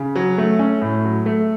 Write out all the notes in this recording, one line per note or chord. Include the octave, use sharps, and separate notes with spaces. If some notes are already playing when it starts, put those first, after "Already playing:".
Already playing: C#3
F#3
A3
C#4
A2
F#3
A3